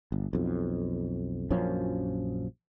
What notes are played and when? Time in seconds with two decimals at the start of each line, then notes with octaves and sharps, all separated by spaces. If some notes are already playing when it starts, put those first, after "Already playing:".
0.12 G1
0.33 B1 F2
1.50 A#1 F#2 F3 C#4